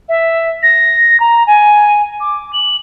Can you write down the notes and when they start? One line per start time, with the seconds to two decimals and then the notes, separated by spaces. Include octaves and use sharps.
0.09 E5
0.63 A#6
1.20 A#5
1.47 G#5
2.20 D6
2.53 F#7